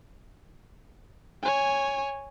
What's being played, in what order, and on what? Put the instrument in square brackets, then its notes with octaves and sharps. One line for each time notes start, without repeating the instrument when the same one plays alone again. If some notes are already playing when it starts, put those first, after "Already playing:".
[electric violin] C#5 G#5